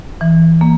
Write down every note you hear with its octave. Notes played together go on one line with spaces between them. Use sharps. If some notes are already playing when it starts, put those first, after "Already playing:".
E3
A#3